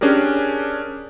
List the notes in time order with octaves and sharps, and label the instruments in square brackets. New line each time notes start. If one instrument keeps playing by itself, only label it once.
[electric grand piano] C#4 D4 G4 G#4 A#4